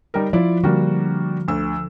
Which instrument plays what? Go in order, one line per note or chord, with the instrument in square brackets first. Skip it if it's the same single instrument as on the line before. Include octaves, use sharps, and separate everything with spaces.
[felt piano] G3 D#4 A#4
[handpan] F3 [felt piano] E4 F4 D5
[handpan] D3 [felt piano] G3 A#3 F#4
[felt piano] D2 E6